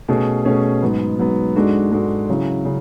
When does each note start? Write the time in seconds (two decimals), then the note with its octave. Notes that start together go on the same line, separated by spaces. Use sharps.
0.09 B2 A3 C#4 G#4
0.45 B2 A3 C#4 G#4
0.82 G#2 F#3 B3
1.18 G#2 F#3 B3
1.55 G#2 G#3 D4 F#4 A4
1.92 G#2 G#3 D4 F#4 A4
2.29 C#3 F#3 C#4 E4
2.65 C#3